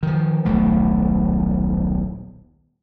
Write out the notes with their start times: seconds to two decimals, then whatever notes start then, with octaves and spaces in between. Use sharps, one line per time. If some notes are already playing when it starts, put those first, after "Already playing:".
0.03 D#3 F3
0.45 D#1 B1 A3